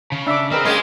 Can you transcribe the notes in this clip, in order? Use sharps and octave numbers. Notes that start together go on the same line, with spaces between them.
C#3
D4 E5 D6
C4 G#4 A#4 B4 D#5
G#3 A#3 C#4 G4 A#4 D#5 G5